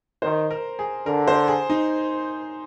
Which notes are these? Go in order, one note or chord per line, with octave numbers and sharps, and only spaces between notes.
D#3 C5
A#4
G#4
D3 A#4
C5
G#4
D#4